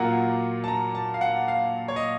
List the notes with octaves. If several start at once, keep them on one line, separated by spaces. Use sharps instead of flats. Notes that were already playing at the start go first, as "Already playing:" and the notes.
Already playing: A#2 F#3 A#3 F4 F#5
A5
A#5
A5
F5
F#5
F5
C#5
D#5